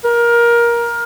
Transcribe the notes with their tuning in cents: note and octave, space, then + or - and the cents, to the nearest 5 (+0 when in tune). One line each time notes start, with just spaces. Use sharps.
A#4 +20